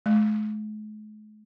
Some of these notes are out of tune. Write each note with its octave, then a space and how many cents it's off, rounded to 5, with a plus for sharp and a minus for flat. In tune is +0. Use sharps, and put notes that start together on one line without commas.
G#3 +45